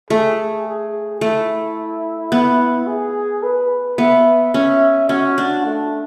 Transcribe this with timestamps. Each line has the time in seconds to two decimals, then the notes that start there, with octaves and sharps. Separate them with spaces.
0.10 A3 G#4
0.66 G#4
1.21 A3 E4
2.32 B3
2.87 G#4
3.43 B4
3.98 B3 E5
4.53 C#4 E5
5.09 C#4 F#4
5.38 D4
5.65 A3